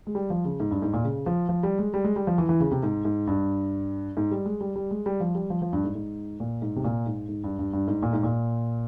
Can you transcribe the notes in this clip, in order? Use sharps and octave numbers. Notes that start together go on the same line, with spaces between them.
G#3
G3
F3
C#3
G#2
G2
G#2
A#2
C#3
F3
F3
G3
G#3
G3
G#3
G3
F3
E3
E3
C#3
C3
G#2
G#2
G2
G#2
G3
G#3
G3
G3
G#3
G3
F3
G3
F3
F3
G2
G#2
G#2
A#2
G#2
C3
A#2
G#2
G#2
G2
G2
G2
G#2
A#2
G#2
A#2